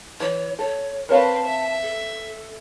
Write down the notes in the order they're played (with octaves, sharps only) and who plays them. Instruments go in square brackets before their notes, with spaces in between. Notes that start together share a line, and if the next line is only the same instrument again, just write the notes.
[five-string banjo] E3 [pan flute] C#5
[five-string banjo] A4 [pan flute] C#5
[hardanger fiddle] C4 B4 [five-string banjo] A#4 C#5 F5 [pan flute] A5
[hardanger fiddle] E5
[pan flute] A4